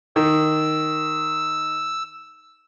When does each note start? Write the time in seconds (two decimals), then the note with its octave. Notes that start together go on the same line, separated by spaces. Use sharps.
0.16 D#3 E6